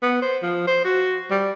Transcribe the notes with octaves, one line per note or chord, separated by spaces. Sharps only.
B3
C5
F3
C5
F#4
G3